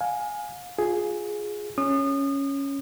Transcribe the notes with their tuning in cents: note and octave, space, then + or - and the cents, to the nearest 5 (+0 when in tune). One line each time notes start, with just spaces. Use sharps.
F5 +35 G#5 +0
F4 +20 G#4 +5
C#4 +0 D#6 -30